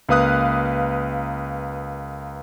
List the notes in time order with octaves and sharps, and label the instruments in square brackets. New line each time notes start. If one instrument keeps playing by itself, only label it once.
[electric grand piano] C#2 A#3 B4 F5 D#6 F#6